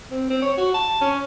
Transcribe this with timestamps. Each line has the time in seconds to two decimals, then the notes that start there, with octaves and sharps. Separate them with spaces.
0.11 C4
0.30 C4
0.42 C#5
0.57 F#4
0.74 A5
1.01 C#4